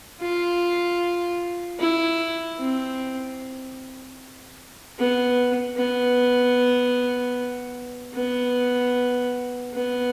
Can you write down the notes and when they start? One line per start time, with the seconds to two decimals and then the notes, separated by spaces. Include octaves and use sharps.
0.21 F4
1.80 E4
2.59 C4
4.98 B3
5.76 B3
8.14 B3
9.73 B3